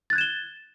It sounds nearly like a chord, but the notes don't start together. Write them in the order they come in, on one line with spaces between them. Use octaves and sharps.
A6 F#6 G#6 E7 G7